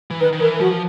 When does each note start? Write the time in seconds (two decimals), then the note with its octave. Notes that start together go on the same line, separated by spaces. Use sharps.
0.11 E3
0.20 D#3 B4
0.32 D#3
0.40 E3 A#4
0.60 F3 F#4